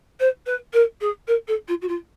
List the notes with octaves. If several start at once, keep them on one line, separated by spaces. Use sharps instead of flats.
C5
B4
A#4
G#4
A#4
A4
F4
F#4
F4